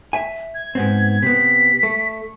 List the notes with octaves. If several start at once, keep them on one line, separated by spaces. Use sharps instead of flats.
E5 G#5
G#6
G#2 B3 C4
C3 B3 B6
A3